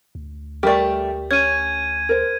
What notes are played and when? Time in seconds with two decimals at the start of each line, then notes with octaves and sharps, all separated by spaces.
0.15 D2
0.63 G3 A3 G4 A#4 D5
1.31 C#4 G#6 D#7
2.09 A#4 C5